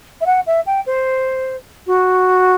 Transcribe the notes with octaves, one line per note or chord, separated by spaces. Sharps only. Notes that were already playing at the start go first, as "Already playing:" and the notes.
E5
F#5
E5
G5
C5
F#4